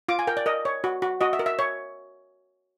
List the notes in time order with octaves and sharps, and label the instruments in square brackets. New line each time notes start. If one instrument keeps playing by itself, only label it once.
[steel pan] F4 D6
G#5
A#4 G5
D5
A#4 D#5
C#5
F#4
F#4
F#4 D#5
E5
A#4
E5
C#5